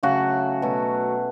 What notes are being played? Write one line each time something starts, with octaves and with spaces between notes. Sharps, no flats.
C#3 F#3 A3 F#4
B2 F#3 A3